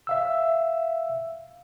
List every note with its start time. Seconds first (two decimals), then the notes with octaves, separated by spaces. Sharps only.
0.07 E5 F5 E6